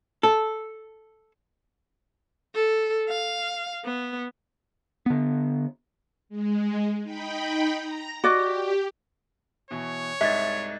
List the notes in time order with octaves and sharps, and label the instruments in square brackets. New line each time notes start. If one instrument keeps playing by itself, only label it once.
[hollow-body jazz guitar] A4
[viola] A4
F5
B3
[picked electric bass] D3 B3
[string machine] G#3
D#4 G5 B5
A#5 A#6
[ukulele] F#4 D5 D#5 [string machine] G4
[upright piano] B2 E3 [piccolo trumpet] C#5
[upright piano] C2 G#2 [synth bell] D#5 G#6 A6 [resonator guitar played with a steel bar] E5